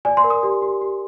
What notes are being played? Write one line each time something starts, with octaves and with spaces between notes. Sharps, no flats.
D5 G#5
C6
A#4
D#6
G4
G4
G4